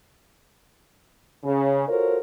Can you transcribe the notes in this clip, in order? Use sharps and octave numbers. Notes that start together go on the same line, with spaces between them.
C#3
F4 F#4 A4 A#4 C5 C#5